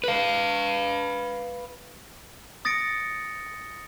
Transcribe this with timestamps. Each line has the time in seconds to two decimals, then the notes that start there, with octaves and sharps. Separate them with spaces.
0.04 B4 F5
2.65 D#6 A6 A#6 C#7 D7